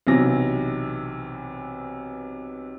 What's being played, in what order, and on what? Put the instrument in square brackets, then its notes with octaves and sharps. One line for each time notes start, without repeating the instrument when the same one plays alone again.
[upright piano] B1 C3 E3 A#6